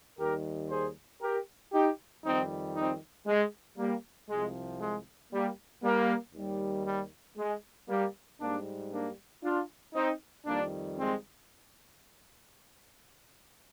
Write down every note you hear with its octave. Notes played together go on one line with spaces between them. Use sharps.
D#2 D#3 G3 G4 A#4
G#4 C5
G4 A#4
D#4 G4
F2 D#3 G3 C4 D#4
C4 D#4
G#3
G3 A#3
C2 C3 F3 G#3
G#3
G3 A#3
G3 A#3
D#2 D#3 G3
G3
G#3
G3 A#3
G#2 G3 A#3 D4
A#3 D4
D4 F4
C4 D#4
F2 D#3 G3 A#3 D4
G#3 C4